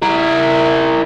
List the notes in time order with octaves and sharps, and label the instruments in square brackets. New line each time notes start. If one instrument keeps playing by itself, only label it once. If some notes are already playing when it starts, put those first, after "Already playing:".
[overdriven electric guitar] E4 A#4